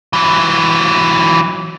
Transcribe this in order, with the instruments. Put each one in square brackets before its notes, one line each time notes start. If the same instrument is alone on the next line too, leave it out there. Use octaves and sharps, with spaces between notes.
[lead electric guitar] E3 F#3